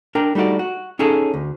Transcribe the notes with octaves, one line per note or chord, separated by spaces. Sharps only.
D4 A#4 G5
G3 A3 D#4 F#4 D5
F#4
C#4 D#4 G#4 A4
D2